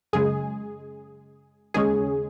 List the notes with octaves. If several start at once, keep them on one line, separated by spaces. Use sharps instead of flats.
F#2 C#3 G#3 G#4
D#2 C#3 G#3 C#4 G#4